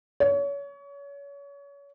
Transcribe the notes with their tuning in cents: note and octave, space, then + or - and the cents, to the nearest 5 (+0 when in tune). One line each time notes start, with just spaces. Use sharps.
C#5 +30